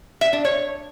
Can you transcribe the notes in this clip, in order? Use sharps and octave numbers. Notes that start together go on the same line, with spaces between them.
E5
D4
C#5